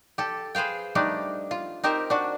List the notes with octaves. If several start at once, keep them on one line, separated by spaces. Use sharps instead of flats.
G4 A4
G#4 B4 C5 F5 G5
G3 A3 D4 D#4
F4
C4 D#4 G4 A#4 C5
D4 F#4